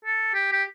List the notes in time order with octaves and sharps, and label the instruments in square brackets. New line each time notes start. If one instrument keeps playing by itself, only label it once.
[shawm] A4
G4
G4